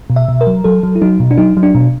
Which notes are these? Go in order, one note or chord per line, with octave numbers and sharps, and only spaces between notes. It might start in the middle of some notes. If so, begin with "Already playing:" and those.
B2
E5
B2
A#4
F#3
F#3 A4
F#3
E4
F#3 D#4
B2
D4
F#3 D#4
F#3
D4
B2